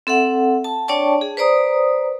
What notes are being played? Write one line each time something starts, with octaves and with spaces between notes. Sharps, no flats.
C4 A4 E5 F#5
A5
D4 C#5 D5 G5 A5 C#6
G#4
B4 C5 D5 A#5 D#6